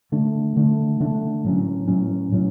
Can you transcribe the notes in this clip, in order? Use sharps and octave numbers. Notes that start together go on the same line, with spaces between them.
D3 A3 D4
D3 A3 D4
D3 A3 D4
A2 F#3 C#4
A2 F#3 C#4
A2 F#3 C#4